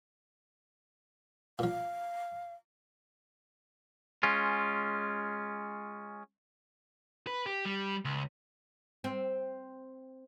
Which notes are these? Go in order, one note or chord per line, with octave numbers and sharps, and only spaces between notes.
A#2 F3 F5
G#3 C#4 F4
B4
G4
G3
C#2
C4